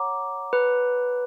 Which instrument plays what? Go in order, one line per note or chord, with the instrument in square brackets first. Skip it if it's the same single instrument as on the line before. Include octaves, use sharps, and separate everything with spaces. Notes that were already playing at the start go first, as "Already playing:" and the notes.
Already playing: [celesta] C#5 F#5 A#5 D6
[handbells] B4